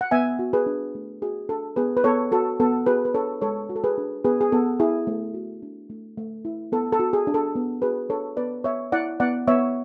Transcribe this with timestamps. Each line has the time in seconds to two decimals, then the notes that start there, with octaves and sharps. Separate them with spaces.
0.01 F#5
0.11 B3 E5 G#5
0.39 F#4
0.53 G#4 B4
0.66 D4
0.95 A3
1.22 F#4 G#4
1.49 D4 A4
1.76 B3 G#4 B4
1.97 B4
2.04 B3 A4 C#5
2.32 F#4 A4
2.60 B3 A4
2.86 F#4 G#4 B4
3.05 B4
3.14 D4 A4 C#5
3.41 G#3 A4 C#5
3.69 F#4
3.76 A4
3.84 G#4 B4
3.98 D4
4.24 B3 G#4 B4
4.41 G#4
4.52 B3 A4
4.80 E4 G#4
5.07 A3
5.34 F#4
5.62 D4
5.90 A3
6.18 A3
6.45 E4
6.72 B3 A4
6.92 A4
6.99 F#4
7.13 G#4
7.27 D4
7.34 A4
7.55 B3
7.82 F#4 G#4 B4
8.09 D4 A4 C#5
8.37 B3 B4 D5
8.64 B3 C#5 E5
8.92 E4 D5 F#5
9.20 B3 D5 F#5
9.48 B3 C#5 E5